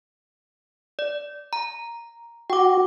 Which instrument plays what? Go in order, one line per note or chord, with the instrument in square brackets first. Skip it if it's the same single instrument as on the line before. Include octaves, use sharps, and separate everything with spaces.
[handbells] D5
A#5
[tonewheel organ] F#4 [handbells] G5 D6